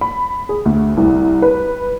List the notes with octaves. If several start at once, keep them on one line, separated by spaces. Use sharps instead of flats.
B5
G#4
D2
C2
B4